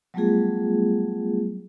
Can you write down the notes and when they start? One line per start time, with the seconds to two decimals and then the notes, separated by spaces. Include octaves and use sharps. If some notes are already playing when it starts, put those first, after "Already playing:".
0.14 F#3 G3 A3 B3 F4 G#4